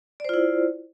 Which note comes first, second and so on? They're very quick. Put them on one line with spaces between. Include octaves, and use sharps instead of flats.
D5 C5 F4 E4